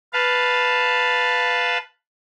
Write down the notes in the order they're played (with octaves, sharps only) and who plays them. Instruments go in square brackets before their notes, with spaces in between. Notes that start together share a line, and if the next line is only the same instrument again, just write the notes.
[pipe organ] B4 F5 A5